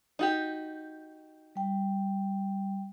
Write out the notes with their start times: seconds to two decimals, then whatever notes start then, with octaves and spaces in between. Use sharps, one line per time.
0.19 D#4 F#4 G4
1.55 G3 G5